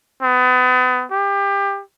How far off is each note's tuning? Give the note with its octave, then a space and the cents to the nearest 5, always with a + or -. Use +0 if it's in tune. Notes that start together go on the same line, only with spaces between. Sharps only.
B3 +35
G4 +25